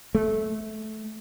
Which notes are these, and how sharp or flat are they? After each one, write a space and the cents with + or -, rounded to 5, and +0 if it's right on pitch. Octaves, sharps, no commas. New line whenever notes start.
A3 -20